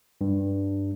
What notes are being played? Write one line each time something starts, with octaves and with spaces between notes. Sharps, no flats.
G2